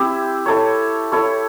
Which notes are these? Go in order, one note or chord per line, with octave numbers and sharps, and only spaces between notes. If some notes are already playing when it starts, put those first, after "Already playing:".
Already playing: C4 E4 G4 C5
E4 A4 C#5
E4 A4 C#5